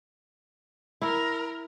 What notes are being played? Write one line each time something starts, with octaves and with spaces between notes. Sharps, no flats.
E4 A#4